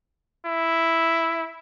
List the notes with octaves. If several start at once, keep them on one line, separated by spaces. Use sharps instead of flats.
E4